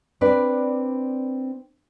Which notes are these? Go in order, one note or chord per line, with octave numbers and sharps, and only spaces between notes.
C4 D4 B4 D5